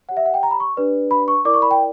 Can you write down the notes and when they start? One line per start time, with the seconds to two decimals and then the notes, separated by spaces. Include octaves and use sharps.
0.09 G4 C#5 F#5
0.17 E5
0.26 F#5
0.34 G5
0.43 A#5
0.51 B5
0.60 C#6
0.77 D4 G4 B4 D5
1.11 B5
1.28 C#6
1.45 E4 A#4 D5 D6
1.54 C#6
1.62 B5
1.71 G5